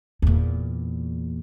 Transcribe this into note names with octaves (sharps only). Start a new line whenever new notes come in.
E2 A#2